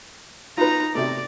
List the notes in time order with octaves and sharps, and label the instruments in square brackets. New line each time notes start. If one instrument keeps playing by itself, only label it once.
[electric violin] D#4 A#5 [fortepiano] F4 B4
[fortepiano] C3 A3 [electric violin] D5